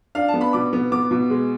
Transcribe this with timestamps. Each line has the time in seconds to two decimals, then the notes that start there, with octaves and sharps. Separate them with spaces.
0.15 D4 F5
0.28 A5
0.34 B3
0.41 B5
0.53 B2 D6
0.73 B3
0.92 B3 D6
1.11 B2
1.30 G#3